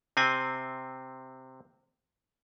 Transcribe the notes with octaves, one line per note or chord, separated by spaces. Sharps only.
C3 C4 G#5